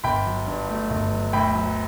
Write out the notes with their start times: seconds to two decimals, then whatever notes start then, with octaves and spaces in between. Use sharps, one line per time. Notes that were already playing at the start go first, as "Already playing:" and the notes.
0.04 G1 G5 B5
0.26 F#3
0.47 G2
0.69 A3
0.90 G1
1.12 F#3
1.33 D2 G5 B5
1.55 F#3